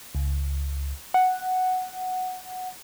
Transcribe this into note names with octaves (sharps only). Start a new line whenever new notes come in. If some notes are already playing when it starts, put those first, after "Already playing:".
C#2
F#5